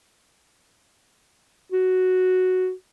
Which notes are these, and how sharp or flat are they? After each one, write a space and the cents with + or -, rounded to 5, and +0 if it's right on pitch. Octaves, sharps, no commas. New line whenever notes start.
F#4 +0